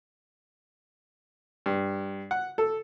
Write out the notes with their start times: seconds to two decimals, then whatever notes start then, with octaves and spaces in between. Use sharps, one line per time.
1.66 G2
2.31 F#5
2.58 A4